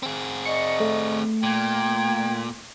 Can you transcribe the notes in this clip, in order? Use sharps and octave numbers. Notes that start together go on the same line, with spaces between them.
C4 G#4
D5 D#5 C#6 C#7
A3
A#2 G5 G#6